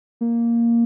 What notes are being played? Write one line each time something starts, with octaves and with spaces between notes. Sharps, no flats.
A#3